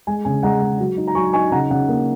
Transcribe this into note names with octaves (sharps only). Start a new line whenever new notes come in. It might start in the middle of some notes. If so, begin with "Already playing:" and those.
G#3 G#5
C#3 G#5
G#3 F#5 A#5
G#3
F#3
D#4
A#5
F#3 G#5 C#6
D#4 G#5 C#6
C#3 F#5 A#5
C#3 F#5
A#3